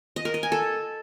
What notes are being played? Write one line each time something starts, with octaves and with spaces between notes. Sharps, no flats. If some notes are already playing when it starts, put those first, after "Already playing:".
D#5
A#4
D#5
G#5
A4